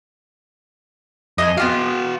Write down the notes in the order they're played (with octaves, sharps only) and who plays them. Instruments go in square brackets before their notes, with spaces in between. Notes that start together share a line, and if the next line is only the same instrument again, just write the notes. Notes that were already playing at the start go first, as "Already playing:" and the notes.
[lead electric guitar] F2 [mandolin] D#5 E5 G#5
[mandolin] B3 F4 F5 [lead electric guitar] F#4 G5